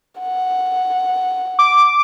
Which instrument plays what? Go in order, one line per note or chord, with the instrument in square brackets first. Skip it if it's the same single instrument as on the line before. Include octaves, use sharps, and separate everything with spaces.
[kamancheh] F#5
[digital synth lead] D6